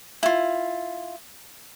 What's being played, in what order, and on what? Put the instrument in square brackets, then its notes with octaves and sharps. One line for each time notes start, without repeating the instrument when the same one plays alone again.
[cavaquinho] E4 F4